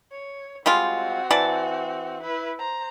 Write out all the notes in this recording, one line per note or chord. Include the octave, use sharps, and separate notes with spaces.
C#5
G3 G#3 C4 F4 F#4
E3 D5 A5
E4 B4
C5 A#5